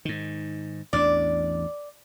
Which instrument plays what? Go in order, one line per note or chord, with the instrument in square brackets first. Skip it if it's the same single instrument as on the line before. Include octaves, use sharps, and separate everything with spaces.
[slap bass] G#2 D#3
[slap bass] A1 E2 D4 [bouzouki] D5